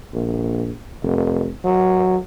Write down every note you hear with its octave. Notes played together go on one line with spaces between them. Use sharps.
A#1
F1
F#3